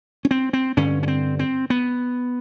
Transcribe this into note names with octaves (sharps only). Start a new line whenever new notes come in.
C#4
C4
C4
G2 D3 C#4
C#4
C4
C4
B3